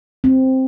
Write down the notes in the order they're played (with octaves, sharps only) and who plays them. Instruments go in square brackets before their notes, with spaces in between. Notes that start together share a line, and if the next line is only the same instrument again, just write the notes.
[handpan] C4